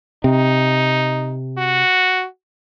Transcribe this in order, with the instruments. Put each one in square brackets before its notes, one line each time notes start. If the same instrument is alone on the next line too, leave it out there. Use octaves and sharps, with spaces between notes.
[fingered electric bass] C3 [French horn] D#4
[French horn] F#4